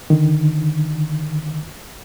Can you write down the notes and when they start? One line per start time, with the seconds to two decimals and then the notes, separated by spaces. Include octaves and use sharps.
0.10 D3 D#3